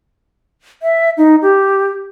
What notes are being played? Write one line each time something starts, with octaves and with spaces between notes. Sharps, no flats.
E5
D#4
G4